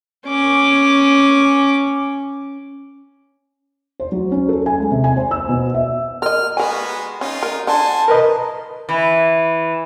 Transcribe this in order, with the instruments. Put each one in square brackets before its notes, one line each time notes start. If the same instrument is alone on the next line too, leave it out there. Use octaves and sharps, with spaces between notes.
[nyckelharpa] C#4 D6
[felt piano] C5
F#3
C#4
A4
G#5
G#3
C3
G#5
C5
E6
B2
E5
[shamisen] A#4 D#5 [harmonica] F6
[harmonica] G#3 B3 F#4 [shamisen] A#4 G#5
[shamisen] C#4 [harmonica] D#4 F4
[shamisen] A#4
[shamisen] D3 [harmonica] C5 G#5 [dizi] A5
[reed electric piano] A#4 B4 D#5
[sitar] E3